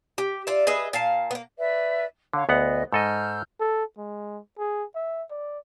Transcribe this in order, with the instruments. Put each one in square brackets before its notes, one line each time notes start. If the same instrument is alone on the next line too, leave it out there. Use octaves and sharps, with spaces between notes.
[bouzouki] G4
F4 D5 E5
G#4 B4 D#5 E5
A#2 F5 A5
A#3 B3
[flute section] B4 D5 E5
[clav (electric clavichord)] D3 [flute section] C#5 F5
[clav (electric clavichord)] D2 B3 F#5 [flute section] D#5
[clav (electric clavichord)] G#2 A4 D#5 [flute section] E6 F6 G6
[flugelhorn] A4
G#3
G#4
E5
D5